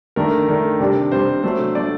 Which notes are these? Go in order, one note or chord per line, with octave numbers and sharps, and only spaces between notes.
D#3 A3 D4 A#4
D#3 A3 D4
C3 G3 D4
C3 G3 D4 C5
F#3 A3 D4 C5
F#3 A3 D4 D5